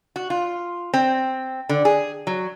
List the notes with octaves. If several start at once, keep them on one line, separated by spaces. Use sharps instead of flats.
F#4
F4
C4
D3
G#4
F#3